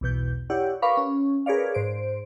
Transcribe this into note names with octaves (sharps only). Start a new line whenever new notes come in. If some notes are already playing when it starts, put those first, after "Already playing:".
B1 E2 B2 G6
E4 G4 C#5 D5 F#5
A#4 B4 F5 B5 C#6 D6
C#4
G#4 A#4 B4 C#5 D5 F5
G#2 C5 D7